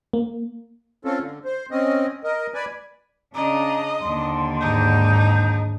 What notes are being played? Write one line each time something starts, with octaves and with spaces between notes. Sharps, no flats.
A#3
C4 C#4 F4 A4
D3
C5
C4 C#4 D#5
A#4 D#5
B4 D5 G#5
C#3 D4 D#5 A#5
D#2 D3 C6
G#2 D#4 G6